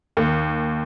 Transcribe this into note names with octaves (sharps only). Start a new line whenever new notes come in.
D#2